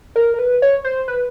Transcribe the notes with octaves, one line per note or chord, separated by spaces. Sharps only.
A#4
A#4
B4
C#5
C5
B4